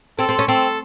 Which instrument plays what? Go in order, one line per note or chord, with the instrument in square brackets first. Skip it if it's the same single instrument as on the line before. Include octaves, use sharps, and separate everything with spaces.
[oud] C4 [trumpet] A4
[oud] C4
C#4
[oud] C4 [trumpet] A4